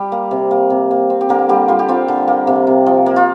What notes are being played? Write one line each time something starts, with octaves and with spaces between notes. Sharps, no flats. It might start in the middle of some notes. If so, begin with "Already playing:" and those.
Already playing: G3 G4
A#3
C3
A#3
C3
A#3
C4
G4
D3 A#3 A#4
D3 G3 G4
G3 F4
G4
C4 F4
D3
A#3
C3
C3
F3
A#3
F4